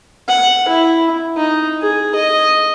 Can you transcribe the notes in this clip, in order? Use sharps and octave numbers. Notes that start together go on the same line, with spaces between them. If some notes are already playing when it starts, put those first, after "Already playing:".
F#5
E4
D#4
G#4
D#5